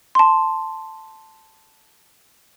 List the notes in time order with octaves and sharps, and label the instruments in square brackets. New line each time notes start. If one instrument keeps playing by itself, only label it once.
[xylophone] A5 C6